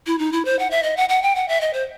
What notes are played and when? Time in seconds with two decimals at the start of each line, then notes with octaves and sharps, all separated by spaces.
0.07 E4
0.19 D#4
0.32 E4
0.45 C5
0.59 F#5
0.71 E5
0.83 D#5
0.97 F#5
1.09 F#5
1.22 G5
1.35 F#5
1.48 E5
1.61 D#5
1.73 C5